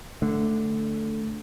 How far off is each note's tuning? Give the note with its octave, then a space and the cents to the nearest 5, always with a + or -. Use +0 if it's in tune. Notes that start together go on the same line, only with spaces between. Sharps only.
D3 +0 A3 +0